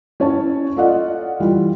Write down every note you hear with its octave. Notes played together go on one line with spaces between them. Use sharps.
C#4 E4 C#5 A5
F4 A4 D5 D#5 F5 F#5
E3 G3 F4